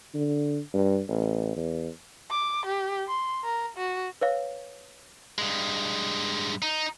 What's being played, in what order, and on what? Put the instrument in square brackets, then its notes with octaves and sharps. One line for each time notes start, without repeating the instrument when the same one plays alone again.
[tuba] D3
G2
A1
E2
[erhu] D6
G4
C6
A#4
F#4
[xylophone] B4 C#5 F5
[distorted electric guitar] G2 G#3
D#4